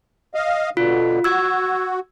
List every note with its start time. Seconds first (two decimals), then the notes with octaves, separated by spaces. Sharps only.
0.34 D#5 F5
0.77 B2 D3 F4
1.24 F#4 E6 G#6